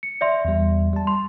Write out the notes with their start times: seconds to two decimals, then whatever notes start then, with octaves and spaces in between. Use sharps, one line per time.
0.03 C#7
0.21 D5 E5 C6
0.45 E2 G3
0.93 G3 A5
1.07 C6